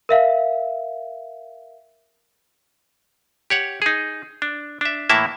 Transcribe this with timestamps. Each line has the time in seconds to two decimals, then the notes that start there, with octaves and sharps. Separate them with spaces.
0.09 A#4 E5 F5
3.50 G4 C#5 F#5
3.82 D#4 G#4
4.42 D4
4.81 D4 E5
5.09 A2 E3 A#3 E4 E5 A5